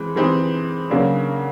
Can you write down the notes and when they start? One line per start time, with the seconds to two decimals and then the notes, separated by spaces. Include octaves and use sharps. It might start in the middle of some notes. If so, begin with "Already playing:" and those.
Already playing: E3 G#3 C4
0.16 E3 G#3 C4 D#4 G4
0.90 C#3 F#3 A#3 D4